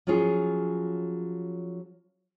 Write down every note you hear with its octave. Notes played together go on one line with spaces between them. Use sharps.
F3 F#3 C#4 F4 G#4